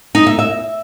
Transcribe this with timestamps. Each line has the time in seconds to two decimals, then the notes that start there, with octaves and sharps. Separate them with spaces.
0.15 D#4
0.27 E5
0.39 E5